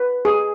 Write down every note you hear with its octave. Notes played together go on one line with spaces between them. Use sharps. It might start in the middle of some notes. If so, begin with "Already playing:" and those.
Already playing: B4
G#4